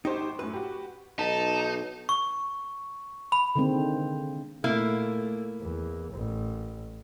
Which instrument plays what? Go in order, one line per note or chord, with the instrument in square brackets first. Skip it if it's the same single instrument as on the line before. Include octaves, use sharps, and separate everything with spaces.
[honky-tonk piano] G#1 C5 G5 [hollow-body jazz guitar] D#4 G4
[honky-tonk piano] F#2 A2 [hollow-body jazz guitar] B4
[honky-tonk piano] F#4 G4
[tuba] B1 [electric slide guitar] D#4 [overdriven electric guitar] A5
[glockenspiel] C#6
B5
[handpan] D3 D#3 G#3 A#3 C4
[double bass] A#2 A3 [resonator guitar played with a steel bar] A#3 E4
[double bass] E2
A1